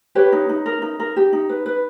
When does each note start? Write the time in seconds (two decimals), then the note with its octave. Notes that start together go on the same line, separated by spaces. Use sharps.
0.15 G4 B4 C#5
0.32 D#4
0.49 D#4
0.66 A#4
0.82 D#4
1.00 A#4
1.16 G4
1.33 D#4
1.49 B4
1.66 B4